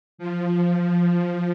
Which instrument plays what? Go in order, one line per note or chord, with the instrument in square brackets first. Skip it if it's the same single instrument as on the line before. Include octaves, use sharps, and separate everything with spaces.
[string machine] F3